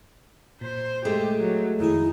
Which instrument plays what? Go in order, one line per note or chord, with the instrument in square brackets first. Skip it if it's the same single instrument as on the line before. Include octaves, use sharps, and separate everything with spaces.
[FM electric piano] A#2 [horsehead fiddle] C5
[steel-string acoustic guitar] G#3 A3 [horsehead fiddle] G4
[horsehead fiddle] F#3
[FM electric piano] F2 D#3 G#4 [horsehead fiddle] D#4 [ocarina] E4